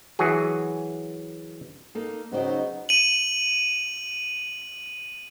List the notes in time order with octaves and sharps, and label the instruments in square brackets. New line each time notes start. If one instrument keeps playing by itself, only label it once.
[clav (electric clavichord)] E3 F#3 F#4 G#4
[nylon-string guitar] A#3 D#4 A4
[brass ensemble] C#3 F#3 D#4 [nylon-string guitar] B3 D5 G5 [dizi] C5
[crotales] D#7 F#7